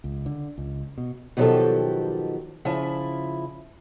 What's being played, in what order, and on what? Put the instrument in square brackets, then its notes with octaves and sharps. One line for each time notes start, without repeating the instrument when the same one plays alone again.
[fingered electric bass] C#2
D3
C#2
B2
[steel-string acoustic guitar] B2 D#3 F3 F#3 G4 A4
C#3 F3 E4 E5 A5